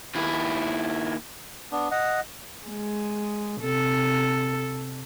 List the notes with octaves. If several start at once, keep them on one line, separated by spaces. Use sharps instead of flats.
D#2 E4
B3 D4
D#5 F#5
G#3
C3 A4